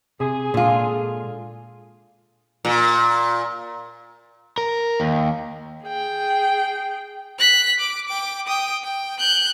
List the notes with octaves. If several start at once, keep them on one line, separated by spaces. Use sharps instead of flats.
C3 G#4
A#2 D3 G#3 F4
A#2
A#4
D#2
G#4 G5
F#6 B6
D6
G5 D6
G5 D#6
G5
F#6 G6